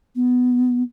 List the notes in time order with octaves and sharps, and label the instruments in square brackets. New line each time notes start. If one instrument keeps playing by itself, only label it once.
[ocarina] B3